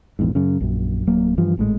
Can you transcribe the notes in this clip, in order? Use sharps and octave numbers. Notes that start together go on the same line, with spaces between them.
A#1 E2 G#2
F#2 C#3
A#1 F#2
D1 F#3 A#3
G2 E3 F3
G#1 A2 C#3 G#3